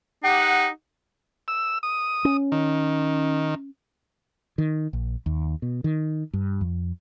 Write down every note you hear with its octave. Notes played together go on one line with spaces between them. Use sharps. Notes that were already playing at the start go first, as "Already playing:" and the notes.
D#4 G4 F#5
E6
D#6
C#4
D#3
D#3
A#1
D#2
B2
D#3
G2
F2